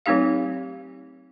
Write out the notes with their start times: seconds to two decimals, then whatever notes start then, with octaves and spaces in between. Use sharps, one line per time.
0.06 F#3 A3 C4 D#4 G4 F5